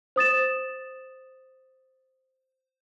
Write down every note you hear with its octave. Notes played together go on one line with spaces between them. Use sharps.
C5 D#6 A6 E7